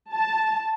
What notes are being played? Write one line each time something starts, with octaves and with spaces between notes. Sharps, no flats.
A5